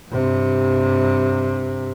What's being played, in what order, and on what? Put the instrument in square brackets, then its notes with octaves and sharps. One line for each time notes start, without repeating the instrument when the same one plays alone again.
[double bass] G2 C3